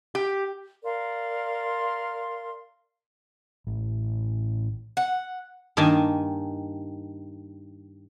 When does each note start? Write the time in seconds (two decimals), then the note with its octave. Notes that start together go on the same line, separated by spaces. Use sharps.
0.15 G4
0.83 A#4 D5 F5 C6
3.67 A1
4.97 F#5
5.77 G2 D#3 A#3 D#5 G#5 A5